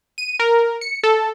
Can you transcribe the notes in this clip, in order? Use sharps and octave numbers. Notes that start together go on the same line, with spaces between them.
D#7
A#4
C#7
A4